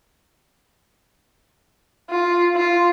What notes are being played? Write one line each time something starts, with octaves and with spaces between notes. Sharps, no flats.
F4
F4